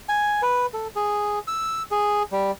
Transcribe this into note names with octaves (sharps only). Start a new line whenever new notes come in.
G#5
B4
A4
G#4
E6
G#4
G3